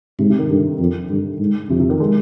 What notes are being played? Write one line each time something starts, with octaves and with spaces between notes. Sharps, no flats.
G#2 C3
C3
D#3
G2 D3
F2
G2 D3
G#2
F2 C3
C3
D#3
G#3